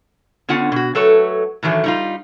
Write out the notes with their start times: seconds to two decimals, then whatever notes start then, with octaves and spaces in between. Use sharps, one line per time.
0.49 D3 B3 C#4 F4 F#5
0.72 B2 F#4
0.95 F#3 A3 A4 B4 C#5
1.63 A2 D#3 E3 F#3 A3
1.84 G3 D#4 F4